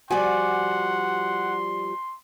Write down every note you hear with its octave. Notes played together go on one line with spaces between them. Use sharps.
F3 G3 F#4 D5 F#5 G#5 C6